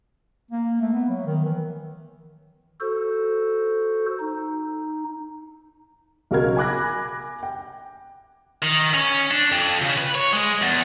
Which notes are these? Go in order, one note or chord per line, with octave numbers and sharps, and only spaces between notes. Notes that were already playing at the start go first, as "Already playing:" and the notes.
A#3
A3
B3
F#3
D#3
E3
F#4 A4 C5
D#4
B1 C#3 F#4 A#4 F6 G#6
G#5 B5 D6 F#6 G#6 A#6
G5
D#3
C#4
D4
F2
C#3
B4
C#5
G#3
E2